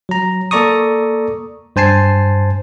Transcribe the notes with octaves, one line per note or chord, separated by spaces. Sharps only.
F#3 A#5
A#3 A4 D5 A#5 C#6 D#6
G2 C5 G#5 A5 C7